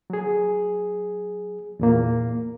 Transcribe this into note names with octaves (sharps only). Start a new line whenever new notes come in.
F#3 G#4
E2 A#2 A#3